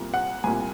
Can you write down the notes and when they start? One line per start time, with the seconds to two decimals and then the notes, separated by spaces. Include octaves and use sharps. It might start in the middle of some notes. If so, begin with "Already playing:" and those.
Already playing: C2 A#2
0.14 F#5
0.44 C2 A#2 G#5